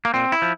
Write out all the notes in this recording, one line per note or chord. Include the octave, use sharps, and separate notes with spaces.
A#3
A#2 C4
E4
F3